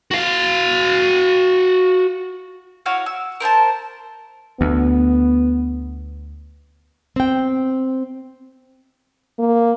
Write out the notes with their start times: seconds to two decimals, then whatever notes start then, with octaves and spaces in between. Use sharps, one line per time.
0.11 F#4 F5
2.86 E4 F#4 C#5 F5
3.06 E6
3.40 A#4 C5 G#5 A5
4.61 D2 B3
7.16 C4 G5
9.39 A#3